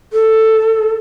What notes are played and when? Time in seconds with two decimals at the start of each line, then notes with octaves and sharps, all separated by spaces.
0.13 A4